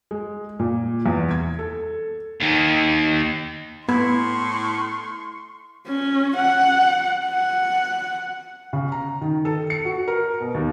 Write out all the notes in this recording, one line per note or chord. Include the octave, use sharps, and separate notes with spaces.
G#3
A#2
E2
G#6
A4
D#2 D#3
A2 B3 E4 C6 C#6
C#4
F#5
F#5
C#3
A#5
D#3
A4
C#7
F#4
A#4
B2
D#2